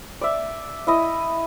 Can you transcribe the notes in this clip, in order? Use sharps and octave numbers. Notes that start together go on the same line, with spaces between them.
D5 E5
E4 D#5